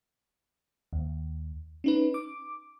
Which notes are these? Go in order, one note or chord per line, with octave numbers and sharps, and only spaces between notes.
D#2
C#4 D#4 B4
D6